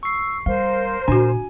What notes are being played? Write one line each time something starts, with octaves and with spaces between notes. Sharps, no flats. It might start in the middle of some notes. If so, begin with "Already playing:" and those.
C#6 E6 C7
G3 A#4 C5 F5
A#2 B3 D4 F#4 G#5